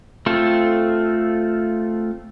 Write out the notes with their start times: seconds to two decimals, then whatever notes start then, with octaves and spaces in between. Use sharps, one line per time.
0.26 A3 C4 F4 A4